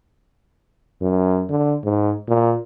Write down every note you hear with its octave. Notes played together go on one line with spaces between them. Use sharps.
F#2
D3
G#2
A#2